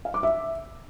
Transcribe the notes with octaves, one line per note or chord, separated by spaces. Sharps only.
F5
D6
E5